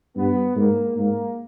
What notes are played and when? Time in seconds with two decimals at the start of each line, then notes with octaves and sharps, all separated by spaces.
0.16 G2 B3
0.56 G#2 A#3
0.96 G#2 A#3